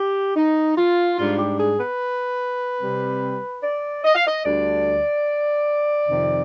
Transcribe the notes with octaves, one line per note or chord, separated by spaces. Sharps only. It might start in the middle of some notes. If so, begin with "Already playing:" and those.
Already playing: G4
D#4
F4
G#2 G3 D4 F4
G4
G#4
B4
C3 G3 C4
D5
D#5
F5
D#5
D2 D3 G3 D4 D5
F2 C3 D#3